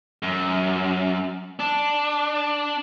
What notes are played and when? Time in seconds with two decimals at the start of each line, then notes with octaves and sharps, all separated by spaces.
0.23 F#2
1.60 D4